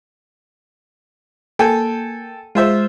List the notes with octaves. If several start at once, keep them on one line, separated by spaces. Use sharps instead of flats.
A#3 A4 G5 G#5
G#3 F4 C5 E5